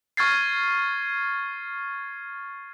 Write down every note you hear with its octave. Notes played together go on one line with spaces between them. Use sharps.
C#6 F6 G#6 A6 C7